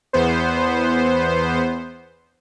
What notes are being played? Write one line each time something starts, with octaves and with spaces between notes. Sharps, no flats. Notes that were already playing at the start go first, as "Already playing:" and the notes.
E2 B3 C5